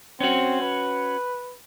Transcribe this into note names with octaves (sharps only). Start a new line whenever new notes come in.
C4 C#4 F#4
B4